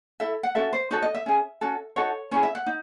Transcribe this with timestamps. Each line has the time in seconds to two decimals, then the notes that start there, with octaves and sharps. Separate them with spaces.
0.20 E4 A4 E5
0.43 F#5
0.55 C#4 F#4 A4 E5
0.73 C5
0.91 D#4 F#4 A4 C#5
1.02 D#5
1.15 E5
1.26 C#4 G#4
1.61 C#4 F#4 A4
1.96 D#4 F#4 A4 C#5
2.31 C#4 E4 G#4 C#5
2.43 E5
2.55 F#5
2.66 D#4